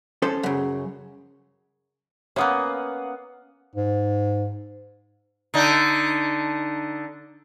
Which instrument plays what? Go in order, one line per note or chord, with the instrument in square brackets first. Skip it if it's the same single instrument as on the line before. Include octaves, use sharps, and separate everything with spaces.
[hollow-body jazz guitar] C#4 A4 C5
F#2 C#3
[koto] A#3 B3 C#4 [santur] F5 F#5 D#6
[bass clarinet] G#2
[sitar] D3 D#4